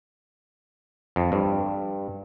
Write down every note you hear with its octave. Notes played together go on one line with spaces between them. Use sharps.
F2
G2